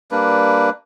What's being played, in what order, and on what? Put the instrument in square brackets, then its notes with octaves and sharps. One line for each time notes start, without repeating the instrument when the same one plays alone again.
[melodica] G3 A#3 D4 B4